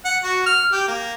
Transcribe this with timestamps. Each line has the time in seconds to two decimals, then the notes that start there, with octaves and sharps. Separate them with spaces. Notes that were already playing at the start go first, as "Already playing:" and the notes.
0.05 F#5
0.23 F#4
0.46 F6
0.72 G4
0.88 A#3